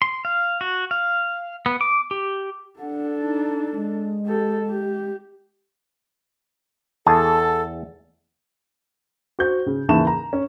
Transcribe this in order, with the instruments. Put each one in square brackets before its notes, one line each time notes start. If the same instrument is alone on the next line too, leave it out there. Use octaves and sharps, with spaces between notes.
[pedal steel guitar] C6
F5
F#4
F5
B3
D6
G4
[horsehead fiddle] D4 A4 [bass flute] F#5
[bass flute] D#4
G#3
[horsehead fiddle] G4 A4
G4
[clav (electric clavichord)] E2 G#4 A5 [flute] A4
[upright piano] F#4 C5 G6
C#3
D#2 C#3 E3 A5 C#6 E7
A#5
C#4